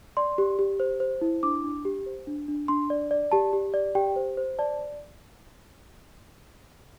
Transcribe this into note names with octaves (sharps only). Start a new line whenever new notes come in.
D5 C6
G4
G4
C5
C5
E4
D4 D6
D4
G4
C5
D4
D4
D4 C6
D5
D5
G4 A5
G4
D5
G4 G5
C5
C5
D5 A5